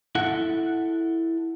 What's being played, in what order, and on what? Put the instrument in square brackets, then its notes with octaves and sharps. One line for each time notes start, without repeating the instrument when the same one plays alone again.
[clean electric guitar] E4 A4 F#5